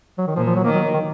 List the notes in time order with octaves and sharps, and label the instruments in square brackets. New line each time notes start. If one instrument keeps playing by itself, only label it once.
[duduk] F#3
D#3
[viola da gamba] A#2 [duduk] F3
[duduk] F3
F#3
[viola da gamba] D#3 [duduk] A#3
[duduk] F#3
D#3